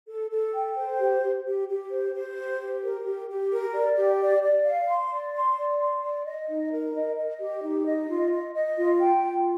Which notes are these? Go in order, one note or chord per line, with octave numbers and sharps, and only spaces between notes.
A4
A4
G5
C5
G4
G4
G4
G4
C5
C5
G4
G4
A#4
G4
G4
A#4
D5
G4
D5
D5
F5
C6
D5
C6
D5
C6
D5
D#5
D#4
A#4
D#5
D#5
G4
D#4
D#5
F4
D#5
D#5
F4
G5
F4